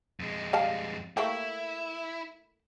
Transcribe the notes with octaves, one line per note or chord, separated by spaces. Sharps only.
F2 G#3
G3 F5 A5
A3 A#3 E4 G4